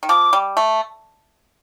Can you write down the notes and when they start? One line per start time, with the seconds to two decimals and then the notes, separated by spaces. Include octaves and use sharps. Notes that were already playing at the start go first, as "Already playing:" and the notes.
0.03 D#3
0.09 F3 D6
0.33 G3
0.57 A3